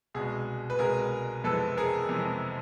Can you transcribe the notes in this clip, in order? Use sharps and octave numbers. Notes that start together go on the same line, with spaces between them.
C2 B2 G#3 G#4
B4
C2 B2 G#3 G#4 A#4
F2 C3 E3 G#3 A4 B4
G#4 A#4
F2 C3 E3 G#3